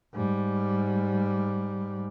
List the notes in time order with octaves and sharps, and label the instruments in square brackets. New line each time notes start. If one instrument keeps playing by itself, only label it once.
[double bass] G#2 G3